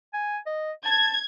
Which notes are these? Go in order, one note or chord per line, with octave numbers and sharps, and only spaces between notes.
G#5
D#5
A5 G#6